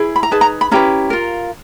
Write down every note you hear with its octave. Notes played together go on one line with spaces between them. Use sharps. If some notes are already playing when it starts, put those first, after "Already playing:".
Already playing: E4 G#4 B4
B5
A#5
D#4 G#4 B4 A5
A#5
B5
C#4 E4 G4 B4 A#5
F4 A#4